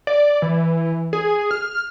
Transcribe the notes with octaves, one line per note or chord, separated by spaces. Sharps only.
D5
E3
G#4
F6